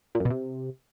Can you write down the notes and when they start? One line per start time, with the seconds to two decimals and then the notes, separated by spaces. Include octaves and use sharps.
0.15 A#2
0.20 F#2
0.25 B2
0.30 C3